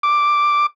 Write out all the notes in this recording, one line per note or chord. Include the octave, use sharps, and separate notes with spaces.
D6